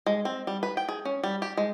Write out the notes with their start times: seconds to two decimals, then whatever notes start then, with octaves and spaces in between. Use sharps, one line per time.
0.06 G#3
0.25 C4
0.47 G3
0.63 B4
0.77 G5
0.89 G#4
1.05 C#4
1.24 G3
1.42 G4
1.57 G#3